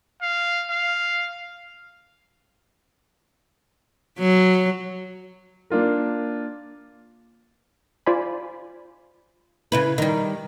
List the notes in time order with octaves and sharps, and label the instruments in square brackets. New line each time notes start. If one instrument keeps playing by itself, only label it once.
[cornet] F5
F5
[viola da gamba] F#3
[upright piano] A#3 D4 F4 A#4
[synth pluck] F4 C5 D5 G#5 B5
[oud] C#3 E4 B4
D#3 G3